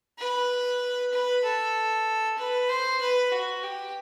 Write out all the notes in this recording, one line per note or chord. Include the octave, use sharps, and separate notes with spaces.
B4
B4
A4
B4
C5
B4
F#4
G4